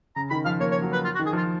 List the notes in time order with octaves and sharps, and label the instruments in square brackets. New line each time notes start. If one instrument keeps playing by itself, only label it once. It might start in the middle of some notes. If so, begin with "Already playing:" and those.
[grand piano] C#3 [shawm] A#5
[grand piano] D#3 [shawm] B5
[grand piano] F3 [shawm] F5
[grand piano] A#3 [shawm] C#5
[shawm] C#5
[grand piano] F#3
[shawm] B4
F4
F#4
[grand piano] D#3
[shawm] G#4
[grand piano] F3 [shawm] F4